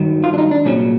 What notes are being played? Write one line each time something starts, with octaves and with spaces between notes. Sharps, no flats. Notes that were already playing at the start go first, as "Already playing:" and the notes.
Already playing: G2 D#3 F#3
F4
D4
D#4
D4
C2 A#2 F#3 C#4